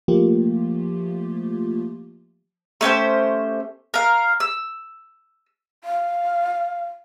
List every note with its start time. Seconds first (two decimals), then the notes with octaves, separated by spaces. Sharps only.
0.08 F3 A3 A#3 F4 G4
2.81 A3 C#4 G4 C5
3.94 A#4 F5
4.40 E6
5.84 F5